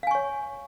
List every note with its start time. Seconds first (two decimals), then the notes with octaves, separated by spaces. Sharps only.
0.03 F5
0.07 G#5
0.11 C#6
0.15 C#5